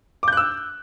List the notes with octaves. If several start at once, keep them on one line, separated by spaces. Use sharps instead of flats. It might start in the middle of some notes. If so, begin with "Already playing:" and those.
D6 E6 F#6 G6